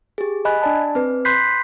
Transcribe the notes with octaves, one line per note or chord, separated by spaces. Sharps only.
G4 G#4
D#5 G#5 B5 F#6
D4 D5 A5
C4 B4
B5 C6 F#6 G6 B6 C7